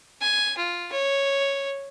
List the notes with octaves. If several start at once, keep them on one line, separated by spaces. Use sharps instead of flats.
G#5
F4
C#5